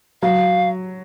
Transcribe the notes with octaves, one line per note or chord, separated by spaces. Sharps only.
F#3 F5